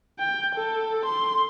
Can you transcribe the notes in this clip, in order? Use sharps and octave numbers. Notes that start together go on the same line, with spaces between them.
G5
A4
C6